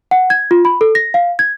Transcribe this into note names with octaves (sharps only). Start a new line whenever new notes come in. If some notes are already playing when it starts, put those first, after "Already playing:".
F#5
G#6
F4
B5
A4
A#6
F5
G#6